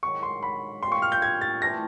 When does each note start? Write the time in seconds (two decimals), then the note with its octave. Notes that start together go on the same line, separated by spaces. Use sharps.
0.03 G#2 D#3 F#3 C#6
0.23 C6
0.43 B5
0.82 A#2 G3 C4 F4 C6
0.92 C#6
1.02 F6
1.12 G6
1.22 G#6
1.41 A6
1.62 E3 A3 D4 A#6